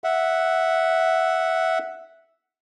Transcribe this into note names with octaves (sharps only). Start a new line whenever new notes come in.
E5 F#5